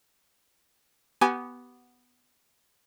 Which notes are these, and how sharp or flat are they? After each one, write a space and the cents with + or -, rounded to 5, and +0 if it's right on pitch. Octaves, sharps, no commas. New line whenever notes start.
B3 +0 G4 -30 G#5 +0